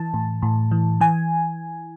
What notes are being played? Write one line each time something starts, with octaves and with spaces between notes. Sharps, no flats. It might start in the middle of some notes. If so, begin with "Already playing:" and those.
Already playing: E3 A5
A2
A2
E3
E3 G#5